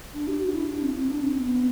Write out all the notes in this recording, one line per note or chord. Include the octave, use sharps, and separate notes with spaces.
D4
G4
F#4
D4
E4
D4
C4
C4
D4
C4
B3